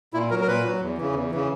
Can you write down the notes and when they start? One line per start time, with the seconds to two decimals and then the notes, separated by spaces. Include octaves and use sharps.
0.14 A#2 E4
0.30 F#3 A#4
0.41 A#4
0.48 A#2 B4
0.64 F#3
0.81 E2
0.98 C#3 E3
1.15 E2
1.31 C#3 E3